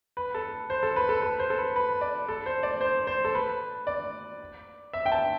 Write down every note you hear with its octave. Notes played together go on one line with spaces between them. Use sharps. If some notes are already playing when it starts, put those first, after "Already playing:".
B4
A4
C5
A4
B4
A4
B4
C5
A4
B4
B4
D5
A4
C5
D5
C5
C5
A4
B4
D5
E5
G5
A5